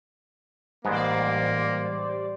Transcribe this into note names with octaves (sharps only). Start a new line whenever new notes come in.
A1 G#2 G3 G#3 A#3 B3 C5 D5